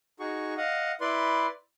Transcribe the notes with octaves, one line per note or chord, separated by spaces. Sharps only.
D#4 F#4 G#4 C#6
D#5 F5 F#5
E4 B4 D5 C6